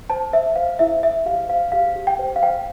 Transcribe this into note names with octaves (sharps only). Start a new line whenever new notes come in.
C5 A5
C5 E5
C5 F5
E4 E5
C5 E5
G4 F5
C5 F5
G4 F5
G4
G5
C5
F5
C5 G5